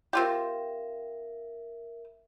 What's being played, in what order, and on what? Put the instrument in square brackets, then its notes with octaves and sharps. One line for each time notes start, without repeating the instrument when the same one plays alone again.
[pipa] C4 F4 G4 [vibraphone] A#4 E5